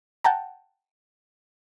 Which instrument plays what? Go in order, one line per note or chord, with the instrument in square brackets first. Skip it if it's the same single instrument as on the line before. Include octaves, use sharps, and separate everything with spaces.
[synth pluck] F#5 G5 A5 A#5